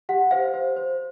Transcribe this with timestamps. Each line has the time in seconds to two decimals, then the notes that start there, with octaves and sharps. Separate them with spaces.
0.09 G4 F#5
0.31 C5 F5
0.54 C5
0.76 C5